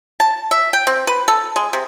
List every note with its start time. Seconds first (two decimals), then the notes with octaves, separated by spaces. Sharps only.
0.20 A5
0.51 E5
0.73 G5
0.87 C4
1.07 B4
1.28 A4
1.56 G#3
1.73 C3